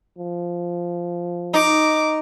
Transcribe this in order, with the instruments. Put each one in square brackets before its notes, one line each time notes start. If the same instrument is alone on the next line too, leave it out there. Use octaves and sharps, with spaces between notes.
[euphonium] F3
[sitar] D#4 [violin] D6